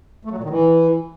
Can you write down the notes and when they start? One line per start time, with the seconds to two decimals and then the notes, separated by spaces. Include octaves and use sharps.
0.25 A3
0.31 F#3
0.37 A#2
0.44 D#3
0.50 E3